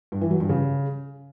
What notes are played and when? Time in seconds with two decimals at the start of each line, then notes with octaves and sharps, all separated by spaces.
0.12 G2
0.21 E3
0.31 F#3
0.40 G2
0.49 C#3